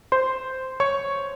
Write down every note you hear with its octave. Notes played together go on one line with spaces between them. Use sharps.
C5 C6
C#5 C#6